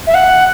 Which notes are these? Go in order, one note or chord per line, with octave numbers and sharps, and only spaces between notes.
E5
F#5